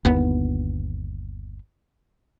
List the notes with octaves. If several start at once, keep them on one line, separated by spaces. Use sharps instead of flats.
G1 D#2 B3